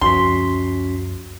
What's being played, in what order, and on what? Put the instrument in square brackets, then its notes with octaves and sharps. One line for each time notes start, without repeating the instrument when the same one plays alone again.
[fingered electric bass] C#2 F#2 F3 [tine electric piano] C#4 F#4 B6 [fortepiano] C6